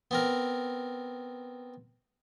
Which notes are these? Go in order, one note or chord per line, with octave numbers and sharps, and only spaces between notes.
B3 C4 A#4